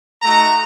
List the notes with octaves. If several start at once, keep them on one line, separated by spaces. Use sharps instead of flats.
A3 D#4 F#4 A#5